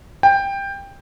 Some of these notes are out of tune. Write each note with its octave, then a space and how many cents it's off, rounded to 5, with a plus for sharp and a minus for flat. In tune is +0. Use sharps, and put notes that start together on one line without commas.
G5 +15